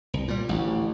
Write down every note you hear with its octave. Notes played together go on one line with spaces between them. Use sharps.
C2
A#2 G3
A1 D2